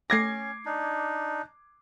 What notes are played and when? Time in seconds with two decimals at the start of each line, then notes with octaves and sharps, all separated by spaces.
0.10 A3 C#4 D6 G#6 A#6 C7
0.65 D4 D#4